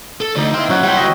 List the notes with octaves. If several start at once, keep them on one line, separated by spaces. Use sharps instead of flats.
A4
D2 D#4 D5
A#3 E4 G5 C6
F#2 E4 C#5 F#5
G3 C5 F#5 G5
F#4 D#5